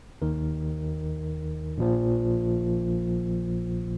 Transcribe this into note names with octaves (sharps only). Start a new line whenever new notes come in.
D#2 D#3 A#4
A#1 A#2 F3